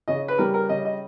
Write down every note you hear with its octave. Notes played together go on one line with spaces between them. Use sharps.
C#3 D#5
B4
G3 A#4
A#4
C#3 D#5
D#5